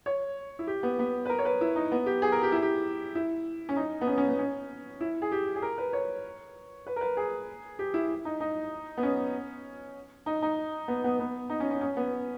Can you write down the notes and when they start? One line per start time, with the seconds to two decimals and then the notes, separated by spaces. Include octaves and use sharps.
0.06 C#5
0.59 E4
0.67 G4
0.83 B3
0.99 B3
1.25 B4
1.29 A#4
1.39 C#5
1.45 B4
1.61 E4
1.76 D#4
1.92 B3
2.06 G4
2.22 G#4
2.32 A#4
2.43 G4
2.52 E4
2.62 G4
3.15 E4
3.69 C#4
3.76 D#4
4.01 B3
4.07 C#4
4.18 C#4
4.29 B3
4.39 C#4
5.01 E4
5.22 G#4
5.32 G4
5.55 G#4
5.62 A#4
5.78 B4
5.93 C#5
6.87 B4
6.96 A#4
7.01 B4
7.17 G#4
7.79 G4
7.94 E4
8.25 D#4
8.40 D#4
8.98 B3
9.03 C#4
10.26 D#4
10.42 D#4
10.88 B3
11.04 B3
11.19 B3
11.50 D#4
11.60 C#4
11.71 C#4
11.81 C#4
11.97 B3